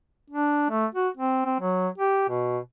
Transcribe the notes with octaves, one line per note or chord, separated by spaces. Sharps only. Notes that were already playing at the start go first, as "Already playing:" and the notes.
D4
A3
F#4
C4
C4
F#3
G4
B2